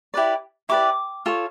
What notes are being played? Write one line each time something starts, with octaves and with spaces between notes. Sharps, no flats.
E4 G4 B4 D5
E4 G4 B4 D5 D6
F4 A4 C#5